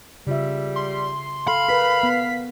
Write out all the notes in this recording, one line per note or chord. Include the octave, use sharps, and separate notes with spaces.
C#3 G3 F4 E5
C6
A4 F5 B5
A#4 B4 B6
B3